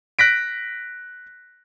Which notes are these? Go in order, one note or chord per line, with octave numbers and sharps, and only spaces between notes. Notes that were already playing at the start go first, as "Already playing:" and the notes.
F#6 A#6 B6 D7